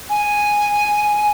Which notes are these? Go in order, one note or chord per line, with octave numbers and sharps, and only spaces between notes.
G#5